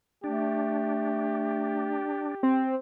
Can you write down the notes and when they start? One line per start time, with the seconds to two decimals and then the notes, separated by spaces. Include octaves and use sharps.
0.24 A3 D4 G4
2.43 C4